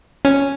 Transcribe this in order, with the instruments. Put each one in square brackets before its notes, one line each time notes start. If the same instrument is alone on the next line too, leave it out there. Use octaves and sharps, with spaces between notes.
[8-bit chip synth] C#4